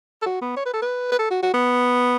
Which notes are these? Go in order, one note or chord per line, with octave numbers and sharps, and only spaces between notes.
A4
F#4
B3
C#5
B4
A4
B4
B4
A4
F#4
F#4
B3